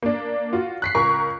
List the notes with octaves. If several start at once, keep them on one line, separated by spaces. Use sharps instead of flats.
A#3 D4
F4 F#4
F#6 B6 C7
C#2 A#4 C#6